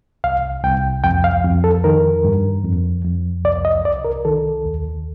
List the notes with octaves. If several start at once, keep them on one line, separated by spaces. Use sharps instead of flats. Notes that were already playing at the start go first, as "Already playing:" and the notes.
C2 F5
C2 G5
F2 G5
F5
F2
A4
D#3 A#4
G2
F2
F2
C2 D5
D#5
C2 D5
A#4
D#3 A4
D#2